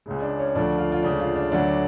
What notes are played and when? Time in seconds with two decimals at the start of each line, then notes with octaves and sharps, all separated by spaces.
0.06 C#2 C#3 G#3
0.22 D4
0.39 C#4
0.55 D2 D3 F3 D4
0.78 F4
0.92 F4
1.03 D2 C#3 G#3 D4
1.20 F4
1.36 D4
1.52 D2 D3 F#3 D4